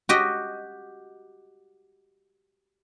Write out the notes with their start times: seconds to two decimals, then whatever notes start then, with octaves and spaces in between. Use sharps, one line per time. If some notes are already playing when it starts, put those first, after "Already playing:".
0.09 F#4 G4 D#5